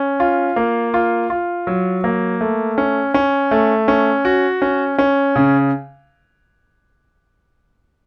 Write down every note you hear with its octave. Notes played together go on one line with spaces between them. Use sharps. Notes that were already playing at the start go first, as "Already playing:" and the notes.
Already playing: C#4
F4
A#3
F4
F4
F#3
A#3
A3
C#4
C#4
A3
C#4
F#4
C#4
C#4
C#3